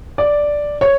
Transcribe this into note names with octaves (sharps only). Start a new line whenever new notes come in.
D5
C#5